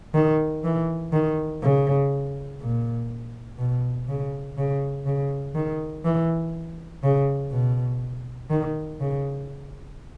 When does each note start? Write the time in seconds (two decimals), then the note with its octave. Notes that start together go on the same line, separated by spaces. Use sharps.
0.14 D#3
0.64 E3
1.12 D#3
1.62 C#3
2.60 A#2
3.59 B2
4.08 C#3
4.57 C#3
5.06 C#3
5.55 D#3
6.05 E3
7.03 C#3
7.51 B2
8.50 D#3
9.00 C#3